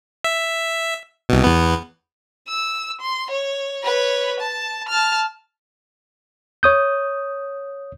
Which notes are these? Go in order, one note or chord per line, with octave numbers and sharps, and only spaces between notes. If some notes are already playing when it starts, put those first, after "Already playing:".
E5
C2 B2
E2 B3
E6
C6
C#5
B4 C#5
A5
A5 F6
C#5 D#6 G6